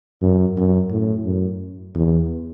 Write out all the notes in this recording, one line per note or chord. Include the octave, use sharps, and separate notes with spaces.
F#2
F#2
A2
F#2
E2